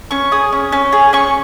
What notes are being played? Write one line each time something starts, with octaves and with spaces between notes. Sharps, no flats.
C#4 C#6
G#4 D#6
C#4
C#4
G#4
C#4 C#6